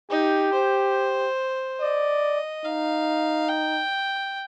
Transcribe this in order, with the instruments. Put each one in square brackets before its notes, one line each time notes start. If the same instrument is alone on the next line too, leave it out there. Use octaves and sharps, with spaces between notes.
[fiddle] D#4 [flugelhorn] G4
[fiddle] C5
[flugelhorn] D5 [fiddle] D#5
[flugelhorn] D#4 [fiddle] F5
[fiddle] G5